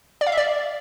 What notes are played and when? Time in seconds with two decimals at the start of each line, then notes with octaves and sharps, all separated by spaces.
0.21 D5
0.27 F5
0.32 E5
0.37 D5